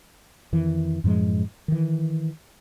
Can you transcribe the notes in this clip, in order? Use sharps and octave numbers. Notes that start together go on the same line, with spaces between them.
F2 D#3 E3
F#2 A2 F3 G#3
D#3 E3